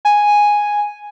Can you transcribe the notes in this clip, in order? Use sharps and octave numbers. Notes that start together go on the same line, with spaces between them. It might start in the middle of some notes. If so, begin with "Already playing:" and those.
G#5